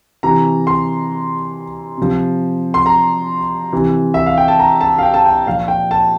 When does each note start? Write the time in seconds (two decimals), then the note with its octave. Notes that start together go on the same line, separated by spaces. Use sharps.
0.23 C3 E3 A#5
0.67 C6
1.98 C3 F3
2.74 C6
2.86 A#5
3.72 C3 E3
4.14 E5
4.26 F5
4.38 G5
4.48 A5
4.59 A#5
4.81 A5
4.98 F5
5.03 G5
5.14 A5
5.25 G5
5.46 A#2 F3 F5
5.68 G5
5.91 A5